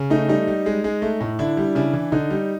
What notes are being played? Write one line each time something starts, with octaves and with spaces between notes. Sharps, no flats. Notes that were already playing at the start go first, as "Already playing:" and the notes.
Already playing: C#3
A3 D#4
G3 D#4
G3
G#3
G#3
A3
A2
D3 D4 E4
G3
C#3 D4 E4
E3
D3 D#4
G3